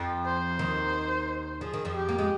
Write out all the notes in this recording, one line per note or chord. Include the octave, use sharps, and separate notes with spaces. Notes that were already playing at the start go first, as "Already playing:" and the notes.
Already playing: F2 F3
C5
D#2 D#3
F3 G#4
D#3
F2 F3
G4
A#3
G#3